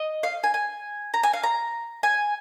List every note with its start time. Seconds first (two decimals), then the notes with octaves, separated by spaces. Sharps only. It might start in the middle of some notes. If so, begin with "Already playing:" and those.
Already playing: D#5
0.23 F5
0.44 G#5
0.54 G#5
1.14 A#5
1.23 G#5
1.33 F5
1.43 A#5
2.03 G#5